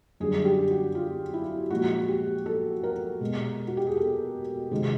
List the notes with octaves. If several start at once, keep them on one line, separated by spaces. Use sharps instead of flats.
F#2 D3 G3 G#4
G4
F#4
F4
E4
A#2 F3 G#3 F#4
G4
A4
A#4
B2 G#3
F#4
G4
G#4
A4
C3 D#3 G#3